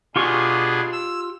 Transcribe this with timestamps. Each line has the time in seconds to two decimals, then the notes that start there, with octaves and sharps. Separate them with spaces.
0.16 B2 D4 F4 G4 G#4 C#6
0.92 E6